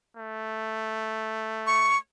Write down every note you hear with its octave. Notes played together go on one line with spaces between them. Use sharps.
A3
C#6